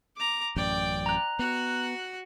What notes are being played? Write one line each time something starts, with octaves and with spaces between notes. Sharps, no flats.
A#5 D6
A1 F#2 D5 G5
A#5 F#6
B3 F#4 F#5